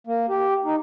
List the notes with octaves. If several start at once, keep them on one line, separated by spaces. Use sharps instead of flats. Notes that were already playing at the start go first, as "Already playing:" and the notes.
A#3
G4
D#4